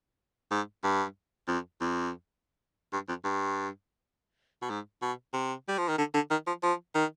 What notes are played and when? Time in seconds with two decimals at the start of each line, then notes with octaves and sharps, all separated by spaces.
0.51 G#2
0.84 G2
1.48 F2
1.81 F2
2.93 G2
3.09 F2
3.24 G2
4.62 B2
4.70 G#2
5.02 B2
5.33 C3
5.68 G3
5.78 F3
5.88 D#3
5.98 D3
6.14 D3
6.31 D#3
6.47 F3
6.63 F3
6.95 D#3